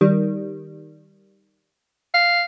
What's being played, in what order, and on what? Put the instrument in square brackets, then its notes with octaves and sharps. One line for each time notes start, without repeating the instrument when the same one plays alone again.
[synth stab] D#3 G3
[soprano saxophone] F5